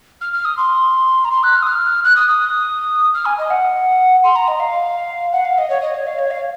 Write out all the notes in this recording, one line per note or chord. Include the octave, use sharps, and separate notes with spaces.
F6
F6
D#6
C6
A#5
C6
F#6
F6
D#6
F6
F#6
D#6
D#6
F6
G#5
D#5
F#5
C6
A#5
D#5
F5
F#5
F5
D#5
C#5
D#5
C#5
F5
C#5
F5